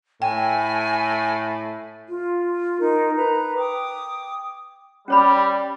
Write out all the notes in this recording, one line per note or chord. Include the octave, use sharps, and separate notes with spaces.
A2 G5 G#5
F4
D#4 A#4
B4 A#5
G5 D6 D#6
G3 C#4 C#5 B5